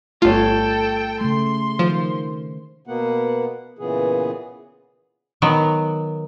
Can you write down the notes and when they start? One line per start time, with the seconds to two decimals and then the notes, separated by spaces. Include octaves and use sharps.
0.22 G1 A3 F4 A4 C#5 G5
1.21 C#3 A3 C6
1.79 D#3 F3 C5
2.87 B2 A#3 B3 F#5
3.79 A#2 C#3 E3 B3 G#4
5.42 D#3 F#3 B3